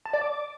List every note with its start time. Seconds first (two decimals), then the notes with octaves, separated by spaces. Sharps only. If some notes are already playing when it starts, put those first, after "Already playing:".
0.05 A5
0.13 D5
0.21 D6